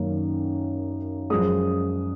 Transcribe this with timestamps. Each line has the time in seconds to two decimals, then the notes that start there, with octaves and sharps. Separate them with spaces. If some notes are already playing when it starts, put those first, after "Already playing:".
Already playing: F#2 D#3 A#3 C#4
1.30 F#2 F3 G#3 D#6